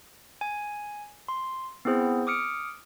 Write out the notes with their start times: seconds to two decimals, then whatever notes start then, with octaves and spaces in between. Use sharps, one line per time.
0.41 G#5
1.28 C6
1.85 B3 C4 E4 G#4 C5
2.27 D6 D#6 F6 C#7 D7